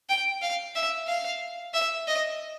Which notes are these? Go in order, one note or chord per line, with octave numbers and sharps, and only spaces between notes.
G5
F5
E5
F5
E5
D#5